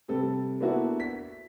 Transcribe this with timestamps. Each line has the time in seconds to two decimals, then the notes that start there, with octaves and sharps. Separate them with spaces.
0.08 C3 G3 A4
0.61 A#3 B3 D4 E4 F#4 A4
1.00 B6